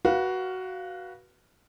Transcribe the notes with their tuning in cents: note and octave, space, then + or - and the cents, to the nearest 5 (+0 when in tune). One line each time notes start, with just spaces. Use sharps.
F#4 +10 B4 -25 F5 +0